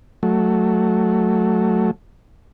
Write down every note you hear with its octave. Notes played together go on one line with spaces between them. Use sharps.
F#3 A3